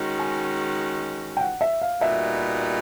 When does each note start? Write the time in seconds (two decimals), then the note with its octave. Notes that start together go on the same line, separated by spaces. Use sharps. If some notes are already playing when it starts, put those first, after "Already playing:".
Already playing: D#3 G#3 C#4 F#4
0.19 G#5
1.37 G5
1.41 F#5
1.61 E5
1.81 F5
2.01 A#2 G3 B3 D#4 F#4 E5